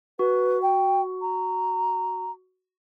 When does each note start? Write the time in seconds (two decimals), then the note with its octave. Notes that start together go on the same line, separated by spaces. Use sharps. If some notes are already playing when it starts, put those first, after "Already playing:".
0.19 F#4 B4
0.62 G5
1.21 A#5